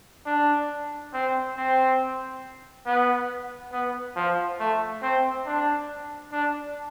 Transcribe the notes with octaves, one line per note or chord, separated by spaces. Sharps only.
D4
C4
C4
B3
B3
F3
A3
C4
D4
D4